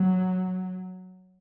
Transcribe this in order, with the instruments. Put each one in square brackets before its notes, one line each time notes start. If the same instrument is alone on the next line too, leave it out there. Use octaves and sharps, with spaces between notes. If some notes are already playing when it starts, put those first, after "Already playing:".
Already playing: [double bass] F#3